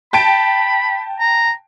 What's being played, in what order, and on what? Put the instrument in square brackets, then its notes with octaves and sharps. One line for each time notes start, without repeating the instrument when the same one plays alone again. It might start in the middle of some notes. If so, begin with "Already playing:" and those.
[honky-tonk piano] G5 A5 D7 [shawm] B5
[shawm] A#5